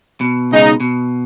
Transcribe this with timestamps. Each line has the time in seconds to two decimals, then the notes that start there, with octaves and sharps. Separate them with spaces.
0.21 B2
0.50 C#3 G#3 D#4
0.80 B2